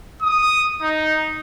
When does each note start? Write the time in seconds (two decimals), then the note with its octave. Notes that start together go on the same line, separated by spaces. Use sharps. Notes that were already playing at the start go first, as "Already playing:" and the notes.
0.22 D#6
0.82 D#4